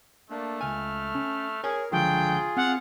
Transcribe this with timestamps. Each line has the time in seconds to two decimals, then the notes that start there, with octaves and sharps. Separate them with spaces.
0.30 A3 A#3 D4
0.61 C#2 G#5 F6
1.15 C#4
1.64 G#4 A#4 C#5 G#5
1.92 C#2 D3 F3 F#3 F4 G#4 G5
2.57 C4 F5 F#5